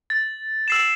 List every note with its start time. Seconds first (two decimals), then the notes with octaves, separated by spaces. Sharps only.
0.10 A6
0.68 E6 C7 E7